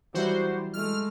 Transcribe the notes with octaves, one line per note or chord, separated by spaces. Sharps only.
E3 F#3 G3 E4 F#4 C5
G#3 A3 F6